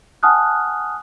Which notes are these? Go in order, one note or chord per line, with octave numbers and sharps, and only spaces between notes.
F#5 G#5 A5 D#6 F6 F#6